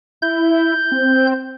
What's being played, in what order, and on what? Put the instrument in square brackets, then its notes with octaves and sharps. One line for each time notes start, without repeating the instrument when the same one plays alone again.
[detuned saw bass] E4 [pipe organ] G6
[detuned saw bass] C4